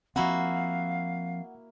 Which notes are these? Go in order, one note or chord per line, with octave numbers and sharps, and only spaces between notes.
F3 A#3 C4 E4 F#4 F5 F#5